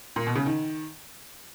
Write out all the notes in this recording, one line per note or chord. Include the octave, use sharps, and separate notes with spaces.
A#2
B2
C#3
D#3